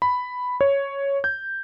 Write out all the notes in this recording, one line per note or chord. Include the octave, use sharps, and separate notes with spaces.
B5
C#5
G6